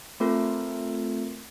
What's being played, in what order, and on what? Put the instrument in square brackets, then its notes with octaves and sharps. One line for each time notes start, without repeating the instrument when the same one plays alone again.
[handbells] A3 C4 F4 A4 A#4